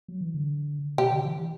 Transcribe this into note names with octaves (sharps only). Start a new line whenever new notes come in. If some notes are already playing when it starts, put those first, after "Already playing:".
F#3
E3
D3
B2 G4
D3
E3
E3